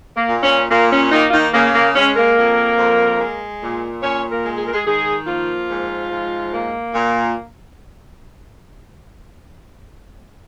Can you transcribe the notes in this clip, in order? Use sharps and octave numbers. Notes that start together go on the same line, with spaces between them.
A#3
A#2
C#4
A#2 A#3
C#4
D#3 A#3 D#4
F4
D#3 D#4
C#3 A#3
A#3
G#3 C#4
A#3 A#4
F2
F2
G#3
A#2
A#2 C#4 C#5
A#3 A#4
G#3
G#4
A#4
G#3 G#4
D#3 G#3 G#4
F3 A#3 F4
G#2
G#2
A#3
A#2